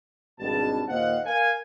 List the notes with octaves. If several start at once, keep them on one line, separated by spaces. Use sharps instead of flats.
G#1 G2 B2 A5
D#2 A#2 C5 D#5 F5 F#5
A#4 F5 G#5